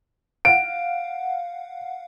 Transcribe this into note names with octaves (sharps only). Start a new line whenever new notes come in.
F5 F#5 D7